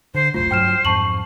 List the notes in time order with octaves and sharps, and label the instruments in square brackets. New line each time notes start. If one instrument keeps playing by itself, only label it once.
[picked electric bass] D3 [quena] C5
[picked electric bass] F1 B1 A3 [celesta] F4 [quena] C5
[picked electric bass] G2 F#3 [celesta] G5 F6 E7
[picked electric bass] F2 G#2 [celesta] A5 C#6 F#7